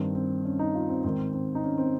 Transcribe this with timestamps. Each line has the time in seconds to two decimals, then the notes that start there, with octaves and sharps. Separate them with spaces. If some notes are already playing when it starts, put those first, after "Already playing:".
Already playing: G2 D#3 C4
0.15 C4
0.45 C#4
0.59 D#4
0.75 F4
0.89 C4
1.04 G#2 D#3 C4
1.33 C4
1.55 D#4
1.64 C#4
1.78 C4